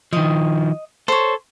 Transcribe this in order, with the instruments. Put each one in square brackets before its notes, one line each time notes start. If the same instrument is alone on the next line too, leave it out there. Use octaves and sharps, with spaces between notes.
[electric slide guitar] D#3 F3 [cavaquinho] D#5
[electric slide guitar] A4 [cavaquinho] C5 C#5